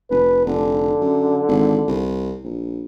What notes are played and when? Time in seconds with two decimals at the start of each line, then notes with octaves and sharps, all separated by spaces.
0.11 F1 B4
0.46 F1 D3
1.01 F#2
1.48 G#1
1.88 C2
2.44 A#1